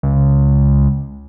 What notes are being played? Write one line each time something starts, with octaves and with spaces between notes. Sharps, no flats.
C#2